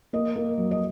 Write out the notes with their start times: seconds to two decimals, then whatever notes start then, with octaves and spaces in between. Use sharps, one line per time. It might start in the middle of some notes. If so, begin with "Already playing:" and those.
0.13 A#3 D#5
0.36 A#3
0.57 F#3
0.71 D#5